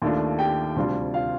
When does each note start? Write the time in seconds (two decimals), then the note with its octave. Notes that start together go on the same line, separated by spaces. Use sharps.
0.02 D#2 D#3 A3 D4 F4
0.39 G4 G5
0.76 D2 C3 G3 D4 F4
1.14 F4 F5